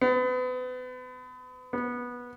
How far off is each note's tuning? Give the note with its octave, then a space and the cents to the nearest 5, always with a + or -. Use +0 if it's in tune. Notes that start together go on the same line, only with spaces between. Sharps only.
B3 +35
B3 -15